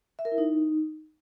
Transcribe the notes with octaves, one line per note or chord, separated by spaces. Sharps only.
E5
A#4
E4
D#4